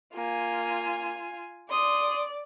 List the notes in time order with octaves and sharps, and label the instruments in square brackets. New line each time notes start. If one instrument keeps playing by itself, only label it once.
[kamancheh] A#3 [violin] F4 G#5
[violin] D5 [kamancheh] C6 D#6